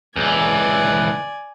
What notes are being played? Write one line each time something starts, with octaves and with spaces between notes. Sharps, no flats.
C#2 E3 D5 G#5